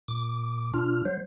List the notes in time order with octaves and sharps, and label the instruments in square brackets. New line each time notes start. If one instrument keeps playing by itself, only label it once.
[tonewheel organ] A#2 D6
B2 D4 F4 F6
F#3 C5